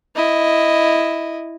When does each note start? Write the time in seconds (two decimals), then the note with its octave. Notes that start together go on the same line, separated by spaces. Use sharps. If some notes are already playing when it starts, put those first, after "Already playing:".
0.16 E4 D#5